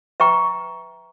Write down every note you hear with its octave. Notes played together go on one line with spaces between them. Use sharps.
B4 E5 G5 A#5 C#6